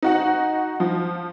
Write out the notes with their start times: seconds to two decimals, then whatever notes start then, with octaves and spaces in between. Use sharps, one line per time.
0.02 D#4 F#4 F#5
0.80 F3